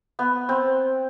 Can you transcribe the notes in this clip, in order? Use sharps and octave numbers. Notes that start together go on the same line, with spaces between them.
B3
C4